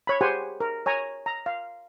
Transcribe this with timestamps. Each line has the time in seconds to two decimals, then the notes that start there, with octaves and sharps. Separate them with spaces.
0.07 C#5 B5
0.21 G4 G#4 C5 F#5 G#5
0.60 A#4
0.86 C#5 G#5 A#5
1.26 A#5
1.46 F5